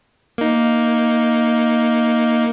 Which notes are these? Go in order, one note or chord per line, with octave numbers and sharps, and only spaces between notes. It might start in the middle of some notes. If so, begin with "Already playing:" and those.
A#3 D#4